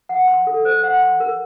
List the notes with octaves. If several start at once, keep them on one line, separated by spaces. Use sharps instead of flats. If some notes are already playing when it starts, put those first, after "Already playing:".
F#5
C6
A4
C5
F#5
C6
A#4